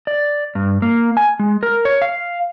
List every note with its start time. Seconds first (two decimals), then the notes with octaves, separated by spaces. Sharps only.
0.07 D5
0.55 G2
0.82 A#3
1.17 G#5
1.39 G#3
1.63 A#4
1.85 C#5
2.02 F5